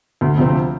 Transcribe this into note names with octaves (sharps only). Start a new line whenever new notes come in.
D2
C3 F3 C4